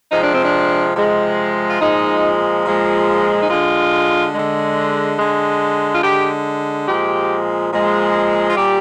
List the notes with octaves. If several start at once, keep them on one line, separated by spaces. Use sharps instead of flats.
C3 F3 G#3 D#4
D4
C4
D4
C3 F3 G#3
F4
A#2 F3 G#3 D#4
A#2 F3 G#3
D#4
D3 G#3 F4
D3 G#3
D3 G#3
F4
D3 G#3 G4
A#2 F3 G#3 G4
A#2 F3 G#3
F4
A#2 G3 G4